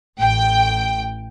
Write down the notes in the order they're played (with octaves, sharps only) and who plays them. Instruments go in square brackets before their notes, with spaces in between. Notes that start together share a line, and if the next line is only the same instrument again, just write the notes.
[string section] A1 G5